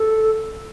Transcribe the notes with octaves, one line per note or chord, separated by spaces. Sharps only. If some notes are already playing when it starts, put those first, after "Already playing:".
Already playing: A4